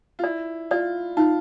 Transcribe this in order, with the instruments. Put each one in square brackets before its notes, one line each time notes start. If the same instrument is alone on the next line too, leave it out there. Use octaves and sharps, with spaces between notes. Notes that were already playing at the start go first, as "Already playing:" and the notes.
[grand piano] F4
[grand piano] E4 [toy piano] D5
[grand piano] F4 [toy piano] D5
[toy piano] D#4 [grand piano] F4